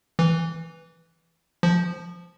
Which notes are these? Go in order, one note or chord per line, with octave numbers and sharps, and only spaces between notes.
E3
F3